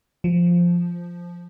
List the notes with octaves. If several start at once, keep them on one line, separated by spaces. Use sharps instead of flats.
F3